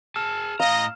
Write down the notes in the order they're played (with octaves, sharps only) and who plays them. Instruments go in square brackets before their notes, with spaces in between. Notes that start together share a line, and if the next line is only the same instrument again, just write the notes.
[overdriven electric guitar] G#4 A5 [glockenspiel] E6 F6 E7
[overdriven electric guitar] A2 A#5 [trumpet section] D#5 [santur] F5